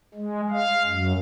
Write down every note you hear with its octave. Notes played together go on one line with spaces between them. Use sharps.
G#3
F5
F#2